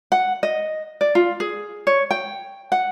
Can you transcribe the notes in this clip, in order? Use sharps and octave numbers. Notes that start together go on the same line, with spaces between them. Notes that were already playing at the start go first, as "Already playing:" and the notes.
F#5
D#5
D5
F4
G#4
C#5
G5
F#5